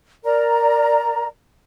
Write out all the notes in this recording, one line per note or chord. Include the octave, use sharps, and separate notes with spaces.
A#4 D5 A#5